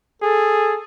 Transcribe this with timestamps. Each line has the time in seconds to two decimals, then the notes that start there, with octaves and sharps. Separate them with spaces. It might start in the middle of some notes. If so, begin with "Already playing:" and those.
0.22 G#4 A4